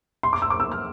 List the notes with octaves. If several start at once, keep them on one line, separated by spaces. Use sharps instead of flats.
C6
D6
E6
D6
E6
F6